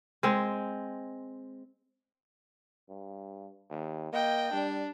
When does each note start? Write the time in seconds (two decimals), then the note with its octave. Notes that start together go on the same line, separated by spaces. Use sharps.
0.23 G#3 C4
2.89 G2
3.70 D#2
4.13 A#3 D#5 G5
4.53 G3 D4